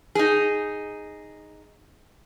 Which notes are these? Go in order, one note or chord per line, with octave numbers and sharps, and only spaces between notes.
D#4 G#4